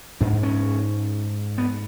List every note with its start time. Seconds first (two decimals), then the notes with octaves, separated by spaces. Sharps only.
0.21 G#2 D4
0.43 C#4
1.58 B3